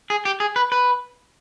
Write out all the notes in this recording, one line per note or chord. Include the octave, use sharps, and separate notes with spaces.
G#4
G4
G#4
B4
B4